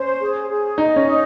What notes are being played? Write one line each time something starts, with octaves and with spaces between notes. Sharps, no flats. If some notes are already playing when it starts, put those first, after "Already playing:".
Already playing: C#4 C5
G#4
G#4
D#4 D#5
C#4
D#4